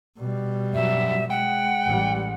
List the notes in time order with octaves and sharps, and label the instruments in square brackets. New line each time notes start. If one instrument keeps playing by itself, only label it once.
[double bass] B2 G3
[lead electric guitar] G2 F#3 [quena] E5
[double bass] G#3 [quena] F#5 [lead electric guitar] G5
[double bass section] A1 G3